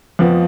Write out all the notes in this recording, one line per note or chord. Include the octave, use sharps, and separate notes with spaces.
F2 F3 B3